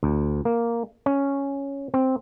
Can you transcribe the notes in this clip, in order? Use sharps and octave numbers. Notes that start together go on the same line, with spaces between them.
D2
A#3
C#4
C4